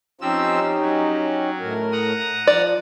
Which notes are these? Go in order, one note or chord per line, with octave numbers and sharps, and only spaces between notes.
F3 C4 C#4 D#4 G4 E6
F#3
A2 A#4
F#5 A#5 D#6
F3 D5